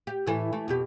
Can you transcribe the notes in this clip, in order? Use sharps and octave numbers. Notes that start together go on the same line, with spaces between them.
G4
A2 E3 A4
E3 A3
F2 B2 G4